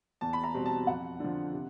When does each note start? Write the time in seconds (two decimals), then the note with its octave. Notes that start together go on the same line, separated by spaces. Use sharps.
0.21 E2 A5
0.33 B5
0.44 A#5
0.54 B2 G3 C4
0.66 A5
0.87 F2 F#5
1.20 D3 F3
1.53 C3